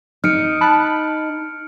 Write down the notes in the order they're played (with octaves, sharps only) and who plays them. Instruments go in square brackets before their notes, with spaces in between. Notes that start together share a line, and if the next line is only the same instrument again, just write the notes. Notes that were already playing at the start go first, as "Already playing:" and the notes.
[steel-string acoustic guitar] D#4 [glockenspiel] F6 C#7 D7
[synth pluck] A5 B5 F#6